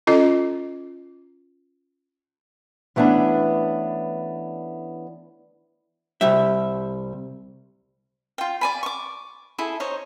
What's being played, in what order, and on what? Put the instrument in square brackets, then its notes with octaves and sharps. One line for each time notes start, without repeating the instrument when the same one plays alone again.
[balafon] C#4 F4 A4 D#5
[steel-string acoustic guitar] E3 A3 B3 C#4 D4
[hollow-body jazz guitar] C2 G3 E5
[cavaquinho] F4 G5
D5 G#5 B5
C#6 D6
E4 G#4 A4
D#4 C5 C#5 D#5